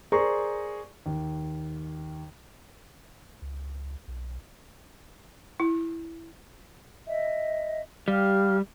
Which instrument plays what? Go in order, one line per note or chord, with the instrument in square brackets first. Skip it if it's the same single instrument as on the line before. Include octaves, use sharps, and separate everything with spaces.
[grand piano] G#4 A#4 C5 D5 A#5 C#6
D#2
[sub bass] C#2
B1
[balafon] E4
[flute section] D#5 E5
[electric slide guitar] G3 [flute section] G4 F5 F6